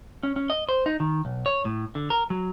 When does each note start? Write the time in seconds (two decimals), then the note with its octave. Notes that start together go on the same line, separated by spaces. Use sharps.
0.23 C#4
0.36 C#4
0.50 D#5
0.69 C5
0.86 D#4
1.00 D#3
1.25 B1
1.46 C#5
1.65 A2
1.95 D3
2.10 A#4
2.30 F#3